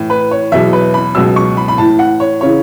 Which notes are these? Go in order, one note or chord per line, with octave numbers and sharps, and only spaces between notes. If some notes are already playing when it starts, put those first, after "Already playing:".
Already playing: A2 E3
B4
C#5
E2 B2 F#3 E5
B4
B5
C#2 B2 F#3 E6
C#6
B5
B5
A2 E3 A5
F#5
C#5
C#3 E3 C#5